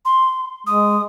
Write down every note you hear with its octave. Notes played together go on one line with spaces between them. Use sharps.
C6
G#3 D#6